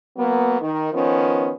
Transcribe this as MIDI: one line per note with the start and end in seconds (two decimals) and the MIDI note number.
0.17 0.57 54
0.17 0.57 58
0.17 0.57 59
0.61 0.90 51
0.93 1.52 51
0.93 1.52 53
0.93 1.52 59
0.93 1.52 61